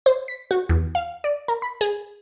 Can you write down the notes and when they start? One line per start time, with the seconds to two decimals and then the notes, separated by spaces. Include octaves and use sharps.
0.06 C5
0.28 B6
0.51 F#4
0.69 E2
0.95 F5
1.24 D5
1.48 A#4
1.62 B5
1.81 G#4